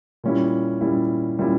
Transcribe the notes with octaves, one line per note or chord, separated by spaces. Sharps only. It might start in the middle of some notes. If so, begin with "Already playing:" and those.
A#2 G3 C#4 E4
A#2 G3 C#4 E4
A#2 G3 C#4 E4